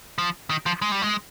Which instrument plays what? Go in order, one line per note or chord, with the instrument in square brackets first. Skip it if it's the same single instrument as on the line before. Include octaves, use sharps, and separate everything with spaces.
[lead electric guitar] F3
D#3
F3
G#3
G3
G#3